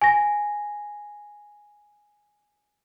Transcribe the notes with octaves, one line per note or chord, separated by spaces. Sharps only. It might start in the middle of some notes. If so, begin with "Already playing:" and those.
G#5 A#6